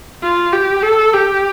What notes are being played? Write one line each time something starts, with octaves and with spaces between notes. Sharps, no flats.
F4
G4
A4
G4